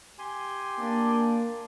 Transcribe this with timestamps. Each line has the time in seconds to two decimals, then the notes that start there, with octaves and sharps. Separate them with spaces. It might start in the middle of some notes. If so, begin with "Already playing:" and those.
0.19 G4 G#5 C6
0.79 A#3 D4